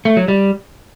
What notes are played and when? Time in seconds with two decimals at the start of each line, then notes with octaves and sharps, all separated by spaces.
0.05 A3
0.17 F#3
0.28 G3